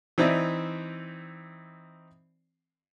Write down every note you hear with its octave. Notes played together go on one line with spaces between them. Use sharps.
E3 C4 D#4 D5 E5